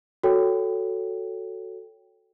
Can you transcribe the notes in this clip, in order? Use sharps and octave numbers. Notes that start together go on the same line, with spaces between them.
F#4 A4 C#5 G5